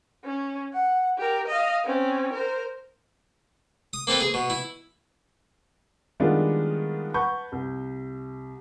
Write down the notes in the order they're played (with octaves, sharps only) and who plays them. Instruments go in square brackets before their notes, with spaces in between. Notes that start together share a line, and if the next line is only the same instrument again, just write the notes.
[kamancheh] C#4
F#5
G4 A#4
D#5 F5
C4 C#4
A#4 C5
[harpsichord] D#6
A#3 C4 A4 B4
G#4
B2
E4
[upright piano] D#3 G3 G#3 B3 D4 F4
B4 F#5 A5 C#6 G6
C2